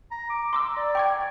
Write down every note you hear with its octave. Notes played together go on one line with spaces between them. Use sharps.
A#5
D6
A#5 C6 D6 E6
D5
G5 C#6 G#6